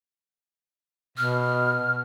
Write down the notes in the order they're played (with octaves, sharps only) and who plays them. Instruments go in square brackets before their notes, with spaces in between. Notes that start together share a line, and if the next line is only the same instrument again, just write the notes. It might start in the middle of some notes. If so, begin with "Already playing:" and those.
[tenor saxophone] B2 [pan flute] F6